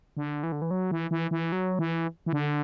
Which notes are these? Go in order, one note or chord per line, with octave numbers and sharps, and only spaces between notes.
D3
E3
D3
E3
F#3
E3
E3
E3
F#3
E3
E3
D3